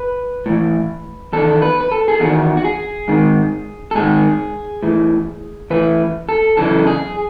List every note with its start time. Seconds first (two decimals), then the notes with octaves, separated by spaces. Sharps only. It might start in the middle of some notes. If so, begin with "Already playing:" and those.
Already playing: B4
0.46 A2 E3
1.33 E2 D#3 A4
1.62 B4
1.81 B4
1.92 A4
2.08 G#4
2.20 E2 D#3 F#4
2.57 F#4
2.65 G#4
3.08 G#2 D#3
3.91 A4
3.95 G#2 D#3 G#4
4.83 A2 E3
5.70 A2 E3 B4
6.29 A4
6.57 F#2 C#3 E3 A4
6.87 G#4